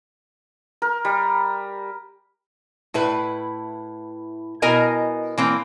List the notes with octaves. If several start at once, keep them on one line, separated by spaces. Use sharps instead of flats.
A#4
G3
A2 E4 B4
B2 E4 A#4 D#5 G#5 A#5
E3 A#3 C4